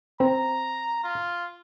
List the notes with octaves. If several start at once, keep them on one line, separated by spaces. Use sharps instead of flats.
C4 A#5
F4